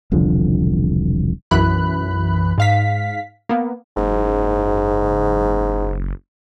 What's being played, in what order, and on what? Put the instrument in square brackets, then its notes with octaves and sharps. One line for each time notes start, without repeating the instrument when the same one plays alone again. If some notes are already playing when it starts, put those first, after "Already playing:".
[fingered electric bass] E1 C2 D3 F3
[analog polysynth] B1 F#2 E3 B5 F#6
G#2 F5 B6
A#3 B3
[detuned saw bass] F#1 [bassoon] G#2